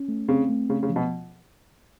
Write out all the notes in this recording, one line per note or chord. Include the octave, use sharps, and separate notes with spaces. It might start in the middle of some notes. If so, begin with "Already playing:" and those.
Already playing: C#4
A3
C#3 C4
A3
C#3 A3
C#3
F3
B2